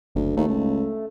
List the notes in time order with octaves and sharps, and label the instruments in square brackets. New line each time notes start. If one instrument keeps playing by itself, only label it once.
[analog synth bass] F#1 [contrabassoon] D2
[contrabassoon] D#2 [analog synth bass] A3
[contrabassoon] C#2